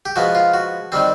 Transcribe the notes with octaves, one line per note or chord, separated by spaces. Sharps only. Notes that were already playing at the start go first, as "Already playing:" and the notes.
G4
F3 G#3 B3 F#4
F4
F#4
D#3 G3 C4